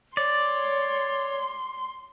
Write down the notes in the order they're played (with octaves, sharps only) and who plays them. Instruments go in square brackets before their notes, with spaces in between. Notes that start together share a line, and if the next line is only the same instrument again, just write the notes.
[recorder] C#5 [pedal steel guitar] D5 [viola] C6